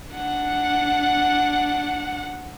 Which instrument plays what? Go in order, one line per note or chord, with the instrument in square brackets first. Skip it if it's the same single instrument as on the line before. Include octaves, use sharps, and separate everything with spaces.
[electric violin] D4 F#5